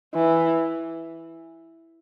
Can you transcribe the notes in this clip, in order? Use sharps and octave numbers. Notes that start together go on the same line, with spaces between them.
E3